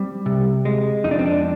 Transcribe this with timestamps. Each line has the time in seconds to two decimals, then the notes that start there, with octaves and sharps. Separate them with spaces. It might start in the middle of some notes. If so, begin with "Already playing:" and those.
Already playing: G3 C4
0.26 C3
0.65 G#3
1.04 F2 D#4
1.11 D4
1.19 C4
1.26 D4